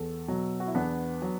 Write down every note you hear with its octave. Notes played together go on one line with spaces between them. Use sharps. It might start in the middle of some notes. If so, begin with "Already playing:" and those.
Already playing: E2 A4
B2 F#3
F#4
E4
E2 B3 D4
F#3